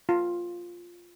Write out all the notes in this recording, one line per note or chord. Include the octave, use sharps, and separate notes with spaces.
F4